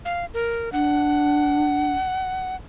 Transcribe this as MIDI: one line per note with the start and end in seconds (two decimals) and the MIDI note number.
0.05 0.25 77
0.34 0.72 70
0.72 1.92 62
0.72 2.55 78